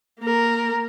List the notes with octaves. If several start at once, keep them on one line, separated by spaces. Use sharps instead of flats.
A#3 A#4